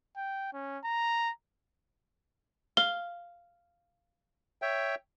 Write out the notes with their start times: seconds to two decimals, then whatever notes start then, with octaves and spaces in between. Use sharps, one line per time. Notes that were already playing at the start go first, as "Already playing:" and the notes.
0.17 G5
0.53 C#4
0.84 A#5
2.77 F5 G7
4.62 C#5 E5 G5